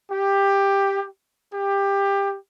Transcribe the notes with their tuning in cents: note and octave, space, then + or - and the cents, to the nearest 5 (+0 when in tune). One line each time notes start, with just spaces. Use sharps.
G4 +10
G4 +20